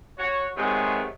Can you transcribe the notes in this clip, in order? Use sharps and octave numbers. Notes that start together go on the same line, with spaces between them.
F#4 C#5
C3 D#3 F#3 G#3 A3 B3